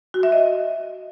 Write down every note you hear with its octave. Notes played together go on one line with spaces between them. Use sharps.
F#4
E5
D#5